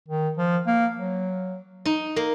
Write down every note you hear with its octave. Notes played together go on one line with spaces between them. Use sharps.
D#3
F3
A#3
F#3
D#4
A#3